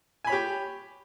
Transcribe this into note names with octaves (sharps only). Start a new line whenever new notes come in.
G4 C#5 G#5 B5